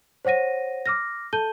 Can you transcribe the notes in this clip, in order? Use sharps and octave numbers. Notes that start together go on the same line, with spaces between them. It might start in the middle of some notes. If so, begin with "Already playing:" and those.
C5 C#5 F#5 A#6 D#7
D6 F6 A#6
A4 A5 G6 D#7 G7